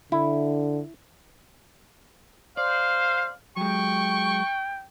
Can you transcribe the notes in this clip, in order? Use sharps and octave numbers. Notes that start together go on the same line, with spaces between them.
D3 E4
C5 D5 F5
F#3 G#3 G5 C#6